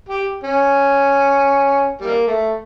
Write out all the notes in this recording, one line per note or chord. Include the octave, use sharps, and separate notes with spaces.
G4
C#4
G3 A#3
A3